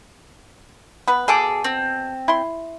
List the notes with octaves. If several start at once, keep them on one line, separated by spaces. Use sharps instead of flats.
B3 B4
B2 G#4 A4 D6
C4
E4 C6